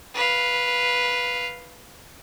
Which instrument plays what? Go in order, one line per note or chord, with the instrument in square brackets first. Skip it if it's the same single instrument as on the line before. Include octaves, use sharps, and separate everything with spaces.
[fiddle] B4 F5